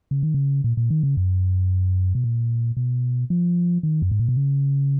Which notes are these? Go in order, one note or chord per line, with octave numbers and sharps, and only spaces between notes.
C#3
D#3
C#3
A#2
A#2
D#3
C#3
F#2
B2
A#2
B2
F3
D#3
F#2
G#2
A#2
B2
C#3